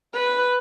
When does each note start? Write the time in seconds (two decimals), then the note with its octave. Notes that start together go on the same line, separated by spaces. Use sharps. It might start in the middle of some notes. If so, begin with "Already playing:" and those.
0.14 B4